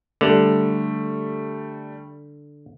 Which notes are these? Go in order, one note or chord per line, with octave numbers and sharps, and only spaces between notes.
D3 G3 A3